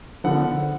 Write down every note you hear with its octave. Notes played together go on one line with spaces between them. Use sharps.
D3 F3 B3 F#5